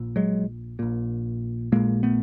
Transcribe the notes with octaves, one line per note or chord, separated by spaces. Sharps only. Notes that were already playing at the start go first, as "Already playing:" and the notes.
Already playing: A#1 A#2
F#3 G#3
A#1 A#2
A#1 A#2 G#3 A#3
A3 B3